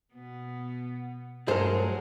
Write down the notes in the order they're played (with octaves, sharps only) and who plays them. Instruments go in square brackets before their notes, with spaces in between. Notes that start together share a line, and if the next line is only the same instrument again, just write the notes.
[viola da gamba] B2 B3
[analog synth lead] G2 [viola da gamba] F#3 G#3 [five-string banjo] A3 A#4 [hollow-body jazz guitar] G#4 C5 A5